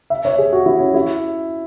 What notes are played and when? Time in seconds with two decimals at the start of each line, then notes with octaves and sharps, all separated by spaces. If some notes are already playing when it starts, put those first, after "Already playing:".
0.10 E5
0.25 C#5
0.38 G#4
0.53 F#4
0.66 E4
0.80 C#4
0.94 E4